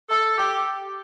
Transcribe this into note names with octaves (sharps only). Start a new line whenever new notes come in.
A4
G4